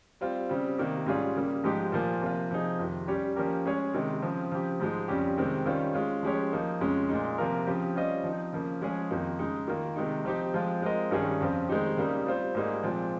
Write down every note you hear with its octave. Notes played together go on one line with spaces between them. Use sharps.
G3 C4 F4
C#3 G3 C4
C3 D#3 A#3
G#2 G3 C#4 F4 G#4
C#3 G3 A#3
G#2 F3 G#3 D#4 G4
A#2 F3 A#3
C3 F3 A#3 F4
C3 F3 C4 D#4 G#4
F2 C3 D#3
G3 C#4 G4 C#5
F3 A#3 C#4 G4 A#4
G#3 C#4 G#4 C#5
C3 D#3 G#3
C#3 F3 C4
C#3 F3 C4 G4
G#2 F3 G#3 D#4
F2 C#3 G3 C#4 G4
C3 D#3 G#3 C4
D#3 G3 C#4 F4 C5
G#3 C#4 F4
F3 G#3 C#4 G4 C#5
F3 A#3 D#4
F2 C#3 G#3 C#4
A#2 G#3 D#4
C3 F3 A#3 F4 A#4
C#3 F3 C4 G4
G3 C#4 F4 C5 D#5
F3 C4 D#4
C#3 F3 A#3
F3 G#3 C#4 G#4
F2 D#3 A#3 D#4
C#3 G#3 D#4
D#3 A#3 F4 A#4
C3 D#3 G#3 D#4
F3 C4 D#4 G4
F3 G#3 C4 F4
G#3 C4 F4 A#4 D#5
G2 D#3 G3 C#4 G#4
F2 C#3 F3 C4 F4
D#3 G#3 C4 D#4 G4
C#3 G3 A#3 D#4
G3 C4 F4 C5
G#2 G3 A#3 D#4 G#4
A#2 F3 G#3 C4 F4